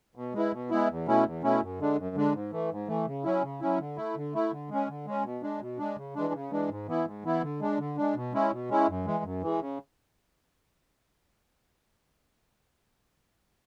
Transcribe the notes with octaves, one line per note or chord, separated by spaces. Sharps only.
B2
G#3 B3 E4
B2
G#3 B3 E4
E2
B2 A3 C#4 E4
E2
B2 A3 C#4 E4
F#2
D3 G#3 D4
F#2
D3 G#3 D4
G#2
E3 A3
G#2
E3 A3
C#3
F#3 C#4 E4
C#3
F#3 C#4 E4
D3
A3 E4
D3
A3 E4
D3
G#3 C#4
D3
G#3 C#4
B2
G#3 D4
B2
G#3 D4
C#3
E3 G#3 D4
C#3
E3 G#3 D4
G#2
E3 B3 E4
G#2
E3 B3 E4
D3
G#3 D4
D3
G#3 D4
B2
G#3 C#4 E4
B2
G#3 C#4 E4
F#2
E3 G#3
F#2
E3 G#3
C#3